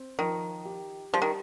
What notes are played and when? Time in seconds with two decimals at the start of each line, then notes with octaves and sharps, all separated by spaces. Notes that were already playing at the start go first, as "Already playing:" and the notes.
Already playing: C4
0.18 D#3 F3
0.65 G4
1.13 F3 G3
1.22 D#3